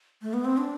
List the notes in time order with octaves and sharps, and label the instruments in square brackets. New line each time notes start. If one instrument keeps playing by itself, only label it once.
[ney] A3
B3
C4
D4